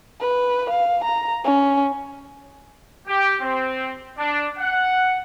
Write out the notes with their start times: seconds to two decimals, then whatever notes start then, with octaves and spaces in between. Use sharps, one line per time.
0.21 B4
0.69 F5
1.04 A#5
1.44 C#4
3.06 G4
3.40 C4
4.17 D4
4.58 F#5